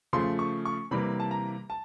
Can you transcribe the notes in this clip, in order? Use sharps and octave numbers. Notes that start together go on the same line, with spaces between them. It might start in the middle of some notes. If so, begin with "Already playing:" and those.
C#3 F3 A3 C6
C#6
C#6
C3 E3 G3 A#3 B5
A5
A#5
A5